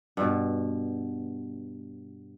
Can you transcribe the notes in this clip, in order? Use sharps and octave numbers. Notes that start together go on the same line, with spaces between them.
G2 B2